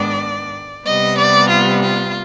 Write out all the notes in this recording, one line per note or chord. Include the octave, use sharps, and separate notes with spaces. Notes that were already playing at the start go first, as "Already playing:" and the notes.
Already playing: G#2 D#3 G#3 B3 D4 D5
C3 G3 B3 D#5
D5
F4
F4